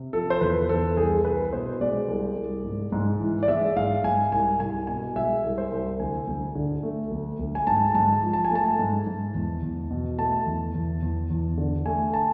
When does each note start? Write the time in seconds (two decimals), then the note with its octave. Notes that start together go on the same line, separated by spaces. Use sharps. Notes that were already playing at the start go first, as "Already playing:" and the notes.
Already playing: C3
0.13 F3 A4
0.30 C5
0.41 E2 B4
0.69 E2 A4
0.97 C2 G#4
1.25 C2 B4
1.53 B2 C5
1.81 G#3 D5
2.08 C2
2.37 C2
2.64 G#2
2.92 G#2
3.20 E3
3.43 D5
3.48 G#3 E5
3.76 G#2 F5
4.04 G#2 G#5
4.32 C2 G#5
4.60 C2 G#5
4.87 B2 G#5
5.16 G#3 E5
5.43 C2
5.58 C5
5.71 C2
5.99 D2 G#5
6.27 D2
6.55 D3
6.83 A3
7.11 D2
7.39 D2
7.55 G#5
7.67 G#2 A5
7.95 G#2 A5
8.23 F3
8.33 A5
8.45 G#5
8.51 A3 A5
8.79 G#2
9.07 G#2
9.35 E2
9.62 E2
9.90 B2
10.18 A3 A5
10.47 E2
10.74 E2
11.02 E2
11.30 E2
11.58 D3
11.86 A3 G#5
12.14 A5